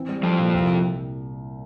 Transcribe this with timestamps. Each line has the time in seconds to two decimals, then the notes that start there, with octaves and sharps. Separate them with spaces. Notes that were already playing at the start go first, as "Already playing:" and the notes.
Already playing: E3 C4
0.09 G3
0.23 F2 F3 C4
0.39 A#2
0.54 C2